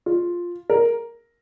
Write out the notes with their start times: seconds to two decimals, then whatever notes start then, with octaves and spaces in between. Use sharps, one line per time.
0.06 F4
0.70 A#4